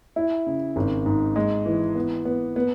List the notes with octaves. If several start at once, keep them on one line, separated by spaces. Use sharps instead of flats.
E4
C#3
G#1
G#2
G#3
E3
B3
B3
B3